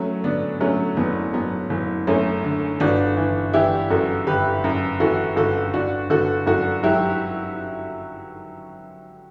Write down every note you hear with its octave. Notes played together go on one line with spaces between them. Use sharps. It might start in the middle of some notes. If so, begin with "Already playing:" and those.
Already playing: F#3 A3 C#4
D3 B3 D4
F#3 A3 C#4
F#1 B3
F#3 B3
F#1
F#2 A3 C#4
D3
G1 D4 F#4
E3
E3 E4 G4
F#2 F#4 A4
G1 G4 B4
F#2
E3 F#4 A4
G1 F#4 A4
D3 D4 F#4
G1 F#4 A4
F#2 F#4 A4
F#3 E4 G4